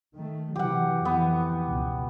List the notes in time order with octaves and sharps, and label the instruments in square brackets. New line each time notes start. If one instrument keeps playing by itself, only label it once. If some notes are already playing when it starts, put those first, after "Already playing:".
[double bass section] D#3 A3
[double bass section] C3 E3 F#3 [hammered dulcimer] G4 F#5
[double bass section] F2 E3 [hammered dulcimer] B3
[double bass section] C#2 B2